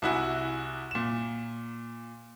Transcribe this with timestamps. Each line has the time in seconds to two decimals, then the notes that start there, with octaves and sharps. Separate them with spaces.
0.02 C2 E4 F#4 G#5
0.91 A#2 E7